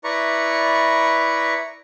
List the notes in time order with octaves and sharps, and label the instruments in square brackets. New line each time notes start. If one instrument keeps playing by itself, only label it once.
[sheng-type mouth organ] E4 B4 D5 A#5 C#6